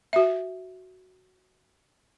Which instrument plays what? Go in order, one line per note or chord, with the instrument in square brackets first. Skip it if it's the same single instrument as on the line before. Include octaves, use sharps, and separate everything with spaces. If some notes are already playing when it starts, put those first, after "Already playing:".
[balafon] F#4 E5